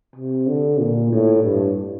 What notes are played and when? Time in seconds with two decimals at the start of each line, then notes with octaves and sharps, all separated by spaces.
0.16 C3
0.48 D3
0.80 A#2
1.13 A2
1.44 G2